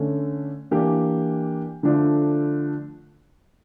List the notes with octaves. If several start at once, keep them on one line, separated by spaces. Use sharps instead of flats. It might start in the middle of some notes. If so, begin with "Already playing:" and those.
Already playing: D3 A3 C#4
E3 A#3 D4 G4
D3 F3 A3 D4